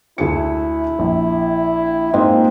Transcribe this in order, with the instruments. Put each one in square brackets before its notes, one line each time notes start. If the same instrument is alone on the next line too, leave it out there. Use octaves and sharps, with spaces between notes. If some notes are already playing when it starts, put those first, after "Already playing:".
[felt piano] D2 G#4 C#7 [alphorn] E4 [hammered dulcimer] E5
[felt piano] A#1
[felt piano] G#2 D#5 [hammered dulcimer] A#3 C4 [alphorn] F4